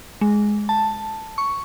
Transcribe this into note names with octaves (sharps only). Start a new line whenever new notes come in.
G#3
A5
C#6